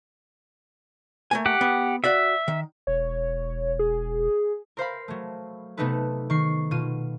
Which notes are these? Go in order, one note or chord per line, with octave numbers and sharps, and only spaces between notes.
A3 A#3 G#5
G4 F#5
B3
F#4 D5 E5 F5
D#3
E1 C#5
G#4
A#4 C5 F5 B5
F#3 A3
C3 A3 B3 D#4 A4 B4
D#3 C#6 C7
B2 F4 D#7